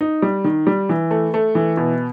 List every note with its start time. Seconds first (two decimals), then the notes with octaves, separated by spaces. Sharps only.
0.01 D#4
0.22 G3
0.44 D#3
0.67 G3
0.89 E3
1.11 A3
1.34 A3
1.55 E3
1.77 B2